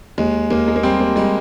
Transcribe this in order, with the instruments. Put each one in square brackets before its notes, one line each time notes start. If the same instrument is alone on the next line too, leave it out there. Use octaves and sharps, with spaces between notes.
[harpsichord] D#2 [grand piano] G#3
[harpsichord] D#2 [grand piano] A#3
[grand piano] G#3
A#3
[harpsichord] G3 [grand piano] C4
[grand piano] A#3
[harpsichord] G3 [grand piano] G#3